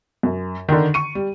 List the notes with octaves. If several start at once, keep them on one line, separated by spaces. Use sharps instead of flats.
F#2
D3 D#3
C#6 D#7
G3